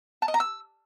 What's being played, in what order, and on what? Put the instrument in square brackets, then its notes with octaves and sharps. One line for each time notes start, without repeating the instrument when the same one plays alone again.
[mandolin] A5
D#5
A#5
E6